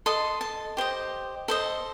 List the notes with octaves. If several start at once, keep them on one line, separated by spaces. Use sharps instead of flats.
A4 D#5 C6
A5
G4 C5 D#5
A4 C5 D#5